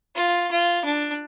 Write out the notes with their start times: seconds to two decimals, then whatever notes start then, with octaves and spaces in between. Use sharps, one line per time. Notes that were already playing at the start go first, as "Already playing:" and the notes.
0.16 F4
0.51 F4
0.85 D4